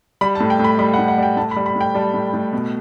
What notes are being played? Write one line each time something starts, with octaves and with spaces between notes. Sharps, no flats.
G3 B5
A5
A2
G5
A2
B5
G3 B5
F#5
A2
F#5
G3 G5
A2 A5
B5
G3
B5
A2
G5
G3 A5
A2
A2
B2